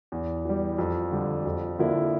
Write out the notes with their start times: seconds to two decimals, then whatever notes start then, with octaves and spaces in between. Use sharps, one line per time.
0.12 E2
0.45 E3 G3
0.78 F2
1.12 D3 G3
1.46 F2
1.79 D3 F3 A#3 E4